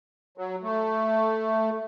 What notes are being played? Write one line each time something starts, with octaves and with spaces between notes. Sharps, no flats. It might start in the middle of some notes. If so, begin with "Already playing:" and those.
F#3
A3